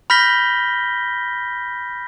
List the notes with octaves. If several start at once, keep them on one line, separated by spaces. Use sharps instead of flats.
B5 F6 G6 A#6 B6 G7